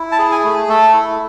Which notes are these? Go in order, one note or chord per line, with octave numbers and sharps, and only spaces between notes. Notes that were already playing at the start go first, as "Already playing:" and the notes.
Already playing: E4
A5
G#4
G#5
A3
A3 A4
E4